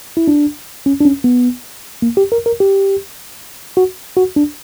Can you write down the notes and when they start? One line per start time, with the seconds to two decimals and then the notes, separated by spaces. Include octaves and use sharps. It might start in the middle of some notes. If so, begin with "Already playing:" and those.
0.17 E4
0.28 D4
0.86 C#4
1.01 D4
1.05 C#4
1.24 B3
2.02 A#3
2.17 G4
2.32 A#4
2.46 A#4
2.60 G4
3.77 F#4
4.17 F#4
4.36 D4